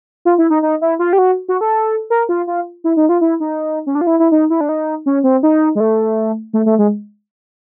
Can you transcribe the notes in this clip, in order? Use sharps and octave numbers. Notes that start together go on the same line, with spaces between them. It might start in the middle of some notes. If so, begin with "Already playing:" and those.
F4
E4
D#4
D#4
E4
F4
G4
F#4
F#4
A4
A#4
F4
F4
E4
D#4
F4
E4
D#4
C#4
D4
F4
E4
E4
D#4
E4
D4
D#4
C#4
C4
D#4
G#3
A3
A3
A3
G#3